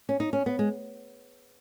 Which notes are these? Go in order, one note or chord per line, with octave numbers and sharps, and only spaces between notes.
C#4
D#4
C#4
B3
G#3